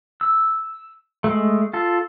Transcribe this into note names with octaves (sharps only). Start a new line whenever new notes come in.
E6
G#3 A3
F4 A4